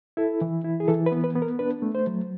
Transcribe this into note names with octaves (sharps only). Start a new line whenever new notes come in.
E4 A4
E3
E4
G#4
E3 A4
B4
B3
B4
B3
A#4
D4 B4
A3
C5
F#3